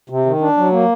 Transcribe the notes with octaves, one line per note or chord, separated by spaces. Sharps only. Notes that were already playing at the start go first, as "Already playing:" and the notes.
C3
D#3
D4
F#3
A#3